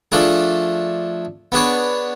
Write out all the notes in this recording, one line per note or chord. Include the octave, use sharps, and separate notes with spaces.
F3 A3 D4 G#4
B3 D4 G#4 C#5